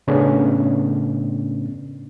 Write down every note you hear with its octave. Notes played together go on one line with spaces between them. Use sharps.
A2 C#3 A3 B3 C#4 D4